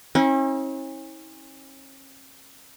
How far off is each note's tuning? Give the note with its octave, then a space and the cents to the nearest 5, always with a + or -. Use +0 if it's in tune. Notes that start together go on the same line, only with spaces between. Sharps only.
C#4 -40 E4 -45